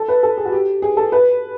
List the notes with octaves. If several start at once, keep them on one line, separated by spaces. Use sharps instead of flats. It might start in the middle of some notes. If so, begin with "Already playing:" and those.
Already playing: A4
B4
A4
G#4
F#4
G4
G#4
A4
B4